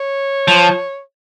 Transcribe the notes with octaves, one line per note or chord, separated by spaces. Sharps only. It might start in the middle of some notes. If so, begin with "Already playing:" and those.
Already playing: C#5
F3